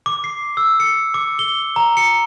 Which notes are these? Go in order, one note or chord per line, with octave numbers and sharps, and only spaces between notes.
D6
C7
E6
C#7
D6
G7
A#5
C#7